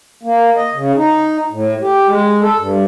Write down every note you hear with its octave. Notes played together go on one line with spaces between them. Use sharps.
A#3
D#5
C#3
D#4
A2
G4
G#3
A4
G2